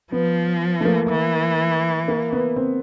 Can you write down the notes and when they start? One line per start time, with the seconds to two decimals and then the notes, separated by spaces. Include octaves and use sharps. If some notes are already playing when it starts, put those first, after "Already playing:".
0.12 F3 B3
0.81 A3
0.85 A#3
1.10 E3
2.08 A#3
2.33 B3
2.56 C4